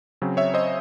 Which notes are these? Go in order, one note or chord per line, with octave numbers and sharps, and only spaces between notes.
C#3 F#3 C4
C#5 E5
C5 D#5